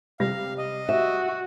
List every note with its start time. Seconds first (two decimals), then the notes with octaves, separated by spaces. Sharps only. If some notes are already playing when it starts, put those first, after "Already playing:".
0.20 C3 G3 F5 A#6
0.58 D#5
0.89 F#4 E5